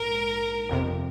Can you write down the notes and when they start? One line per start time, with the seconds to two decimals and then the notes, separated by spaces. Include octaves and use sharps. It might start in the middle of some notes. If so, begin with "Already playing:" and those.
Already playing: A#1 G#2 A#4
0.69 G1 F2 C3